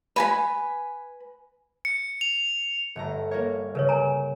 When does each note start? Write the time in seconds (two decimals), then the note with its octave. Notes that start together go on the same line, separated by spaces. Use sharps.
0.16 B4 G#5 B5
1.85 C#7
2.21 F7
2.96 G1 A3 A#5
3.31 A#3 A#4 C#5
3.75 C#3 A#4 B4 C#5
3.89 A#4 G#5 A#5